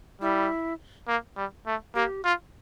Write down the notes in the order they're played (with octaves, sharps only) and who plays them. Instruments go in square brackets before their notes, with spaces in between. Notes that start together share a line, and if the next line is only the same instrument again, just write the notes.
[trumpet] G3 [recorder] E4
[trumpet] A#3
G3
A3
[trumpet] A#3 [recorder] G4
[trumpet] F4